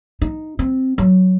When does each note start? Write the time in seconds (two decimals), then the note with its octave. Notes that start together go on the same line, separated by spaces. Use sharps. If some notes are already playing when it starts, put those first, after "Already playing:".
0.22 D#4
0.59 C4
0.98 F#3